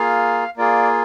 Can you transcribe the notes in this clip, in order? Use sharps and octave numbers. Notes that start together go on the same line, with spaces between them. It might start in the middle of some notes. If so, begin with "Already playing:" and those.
Already playing: A#3 F4 G#4 F5
A#3 F4 G#4 D5